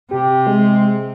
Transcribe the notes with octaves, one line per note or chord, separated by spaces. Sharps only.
C3 G4
G#3